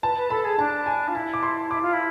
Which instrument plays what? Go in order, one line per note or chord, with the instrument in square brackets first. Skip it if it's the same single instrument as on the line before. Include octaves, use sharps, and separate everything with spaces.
[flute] B4 [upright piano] A5
[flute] B4
[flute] A4 [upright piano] B5
[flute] G#4
[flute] D4 [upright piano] A5
[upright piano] G#5
[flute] F4
[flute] E4 [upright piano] A5
[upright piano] D6
C6
[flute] E4 [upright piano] D6
[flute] F4
E4